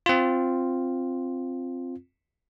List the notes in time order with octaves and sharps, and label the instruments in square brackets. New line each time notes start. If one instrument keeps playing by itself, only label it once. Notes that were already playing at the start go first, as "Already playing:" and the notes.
[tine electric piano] C4 F4